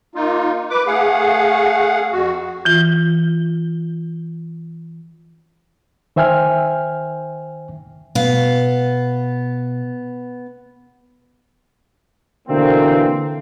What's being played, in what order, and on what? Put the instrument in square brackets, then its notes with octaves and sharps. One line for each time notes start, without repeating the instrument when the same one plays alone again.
[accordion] A#3 D#4 F4
B4 D6
A3 G#4 F5 F#5
F2 F#4
[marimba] E3 F4
[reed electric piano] D#3 C5 E5 G5 G#5 F6
[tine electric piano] B2 [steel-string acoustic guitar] B3 F5
[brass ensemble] B2 D3 E3 A#3 C4